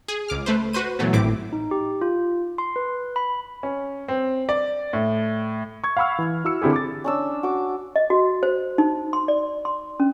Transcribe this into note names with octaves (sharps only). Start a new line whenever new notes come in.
G#4
C#2 D6 F6
A3 B4 C5
F#4 B4 C5 D#7
A#2 E3 F#3 A3 B3
G#1 A2 C4 E4 D6
D#4
G4
F4
C6
B4
B5
C#4
C4
D5
A2
C#6 G#6
F5 F#5 B5 C#6 E6 F6
E3
E4 F#4 E6 C#7
D3 C4 E4 G4 G#4
D6 A6
C#4 D4 E6
F#4 D6
D#5
F#4
C5
D#4
C6
D5
C6
C#4